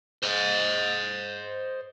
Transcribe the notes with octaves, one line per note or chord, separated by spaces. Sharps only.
C5 D#5